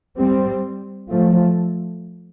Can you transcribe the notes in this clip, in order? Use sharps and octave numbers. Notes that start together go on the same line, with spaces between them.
G3 C4
F3 A3